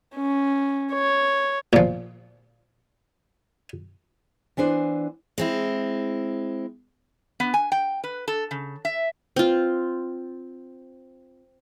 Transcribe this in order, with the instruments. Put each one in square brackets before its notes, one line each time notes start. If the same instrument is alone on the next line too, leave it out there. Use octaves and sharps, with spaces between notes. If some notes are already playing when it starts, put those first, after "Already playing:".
[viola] C#4
C#5
[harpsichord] A#2 F3
[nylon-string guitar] E3 B3 D4 C5
[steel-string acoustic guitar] G#3 C4 E4
[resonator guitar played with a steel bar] B3
G#5
G5
B4
A4
C#3
E5
[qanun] C4 F4